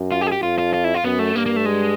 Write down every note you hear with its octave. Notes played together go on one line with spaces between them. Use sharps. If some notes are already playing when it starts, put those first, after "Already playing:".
Already playing: F#2
F4
G4
G#4
G4
F2 F4
F4
F4
E4
F4
F#2 B3
A3
G2 A#3
A#3
A3
G#3